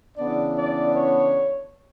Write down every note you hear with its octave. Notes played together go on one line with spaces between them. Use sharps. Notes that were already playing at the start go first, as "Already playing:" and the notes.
C#3 E3 B3 D4 D5
D5
C#5